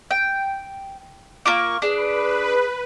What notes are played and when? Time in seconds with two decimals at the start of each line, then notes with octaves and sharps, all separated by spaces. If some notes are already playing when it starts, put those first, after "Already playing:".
0.11 G5
1.46 A#3 F4 C#6 D6
1.82 D4 G#4 B4